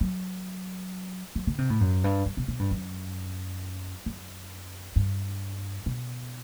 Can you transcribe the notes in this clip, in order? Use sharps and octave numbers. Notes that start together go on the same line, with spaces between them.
F#3
F#3
D3
C3
A2
F#2
G2
G2
B2
B2
G2
F#2
F#2
G2
B2